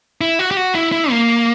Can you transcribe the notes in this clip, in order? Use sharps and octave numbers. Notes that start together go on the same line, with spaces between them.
E4
F#4
G4
F#4
E4
E4
A#3